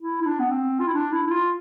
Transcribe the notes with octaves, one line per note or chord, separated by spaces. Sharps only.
E4
E4
D4
B3
C4
F4
E4
D4
E4
E4
F4